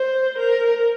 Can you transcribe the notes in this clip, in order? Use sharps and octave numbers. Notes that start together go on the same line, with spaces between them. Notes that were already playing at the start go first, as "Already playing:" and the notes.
Already playing: C5
A#4